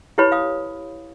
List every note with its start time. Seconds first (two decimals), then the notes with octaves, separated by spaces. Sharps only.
0.18 E4 G4 B4 C#5 B5
0.32 F5 D#6